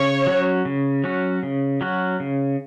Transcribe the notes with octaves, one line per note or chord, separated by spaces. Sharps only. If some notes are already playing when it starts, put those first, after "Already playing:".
Already playing: C#3 C#5
F#3 C#4 F#4
C#3
F#3 C#4 F#4
C#3
F#3 C#4 F#4
C#3